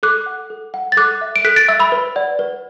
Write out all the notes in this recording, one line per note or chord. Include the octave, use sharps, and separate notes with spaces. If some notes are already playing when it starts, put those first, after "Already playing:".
A4 D6 F#6
F#5
A4
F#5
A6
A4 D6 F#6
E5
D7
A4 F#6 B6
A6 D7
E5 E6 A6
B5 E6
B4
D5 F#5
B4